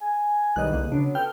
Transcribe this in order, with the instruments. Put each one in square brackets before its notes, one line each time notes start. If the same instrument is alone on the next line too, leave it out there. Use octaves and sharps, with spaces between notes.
[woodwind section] G#5
[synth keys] B1 D#3 G3 [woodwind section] E2 [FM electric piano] D#5 F#6
[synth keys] C2 D3 A#3
[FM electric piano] C#3 [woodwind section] F#3 B3 [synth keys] D4
[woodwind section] B3 F4 A4 [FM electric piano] G5 [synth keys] F6